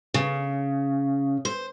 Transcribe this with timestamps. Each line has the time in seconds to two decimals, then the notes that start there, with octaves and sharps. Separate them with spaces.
0.14 C#3
1.45 C5